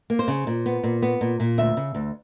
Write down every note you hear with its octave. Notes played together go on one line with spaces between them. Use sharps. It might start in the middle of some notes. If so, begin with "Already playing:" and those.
A#3
C5
C#3
A#2
B3
A#2
B3
A#2
A#2
D2 E5
C#3
D2